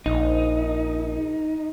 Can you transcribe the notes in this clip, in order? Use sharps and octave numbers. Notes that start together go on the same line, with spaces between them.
A#1 D#4